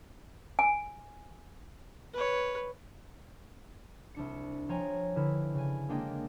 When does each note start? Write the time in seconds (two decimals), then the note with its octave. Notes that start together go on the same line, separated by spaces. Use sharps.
0.59 G#5
2.13 B4 C#5
4.14 C2 D4 C#7
4.69 F3 C#5 G5 G#5 A#5
5.16 D3 E4 B4 F6
5.54 C#3 G#5
5.89 G#3 A#3 D4 D#5 G5